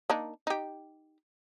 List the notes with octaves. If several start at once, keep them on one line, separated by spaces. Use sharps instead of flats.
A#3 D4 D#4
D#4 G4